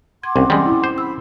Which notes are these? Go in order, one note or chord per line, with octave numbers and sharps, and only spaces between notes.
F#5 C6 D6 G#6
C2 C4 C#4
E3 G3 G#3 C#4
E4
C5
B5 E6